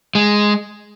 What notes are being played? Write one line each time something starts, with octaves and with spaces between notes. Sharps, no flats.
G#3